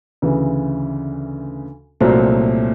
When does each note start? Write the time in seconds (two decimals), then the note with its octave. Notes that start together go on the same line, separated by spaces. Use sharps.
0.22 D2 C#3 E3
2.00 C2 A#2 F#3 A3 C4